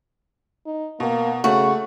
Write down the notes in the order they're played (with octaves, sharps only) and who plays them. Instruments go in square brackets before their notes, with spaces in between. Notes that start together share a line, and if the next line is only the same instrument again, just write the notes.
[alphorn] D#4
[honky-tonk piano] B2 [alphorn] A#3
[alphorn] C#3 [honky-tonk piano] A3 [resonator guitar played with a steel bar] F#4